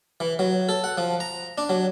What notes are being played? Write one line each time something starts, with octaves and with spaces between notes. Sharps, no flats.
E3
F#3
A4
F#5
F3
A#5
D4
F#3